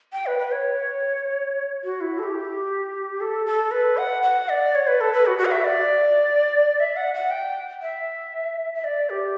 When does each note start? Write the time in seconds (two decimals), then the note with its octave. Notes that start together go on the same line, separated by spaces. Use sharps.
0.13 G5
0.26 B4
0.39 B4
0.52 C#5
1.84 F#4
2.01 E4
2.19 A4
2.23 G4
3.21 A4
3.46 A4
3.71 B4
3.97 F#5
4.23 F#5
4.49 D5
4.75 C#5
4.87 B4
5.01 A4
5.13 B4
5.26 F#4
5.38 F#4
5.45 F#5
5.51 E5
5.64 D5
6.80 E5
6.96 F#5
7.14 F#5
7.31 G5
7.82 E5
8.74 E5
8.84 D5
9.10 G4